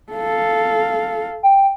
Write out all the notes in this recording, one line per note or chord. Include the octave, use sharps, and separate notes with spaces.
A4 F5
G5